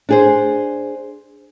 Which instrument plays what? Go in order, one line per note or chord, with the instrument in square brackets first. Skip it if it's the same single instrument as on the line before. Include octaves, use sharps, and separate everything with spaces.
[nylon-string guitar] D4 G#4 C5